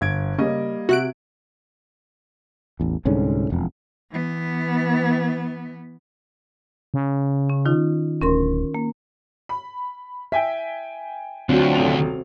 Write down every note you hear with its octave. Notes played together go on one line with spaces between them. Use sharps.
G1 G#6 D7
C#3 G3 A#3 D#5
C3 F#4 E5 F#6 D7
A1 E2
C2 G#2 D3 C#4
E1 F2
E3 B3
C#3
C#4
D#3 D#4 F4
D1 C#4 A#4 C6
A#3
B5
E5 G5 G#5 B6
D2 F#3 C4 D4 F4 F#4
D#1 C3 F7